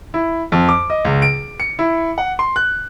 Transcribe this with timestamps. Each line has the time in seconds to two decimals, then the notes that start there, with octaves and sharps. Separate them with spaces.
0.14 E4
0.52 F2
0.69 D6
0.90 D#5
1.05 C#2
1.22 D7
1.60 C#7
1.79 E4
2.18 F#5
2.39 C6
2.56 F#6